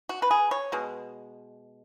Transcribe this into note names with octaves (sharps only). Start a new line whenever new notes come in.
F#4
B4
G#4
C#5
B2 G#3